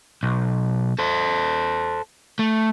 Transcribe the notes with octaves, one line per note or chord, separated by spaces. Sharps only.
B1
A4 C5
A3